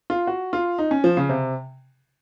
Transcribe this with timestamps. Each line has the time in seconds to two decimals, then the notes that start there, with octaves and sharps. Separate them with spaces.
0.10 F4
0.27 F#4
0.53 F4
0.78 D#4
0.91 C#4
1.04 F3
1.17 C#3
1.29 C3